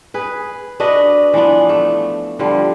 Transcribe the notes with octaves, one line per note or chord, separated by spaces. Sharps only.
G#4 B4
D4 F#4 B4 D#5
E3 F3 B3 D4
A3
D3 F3 G3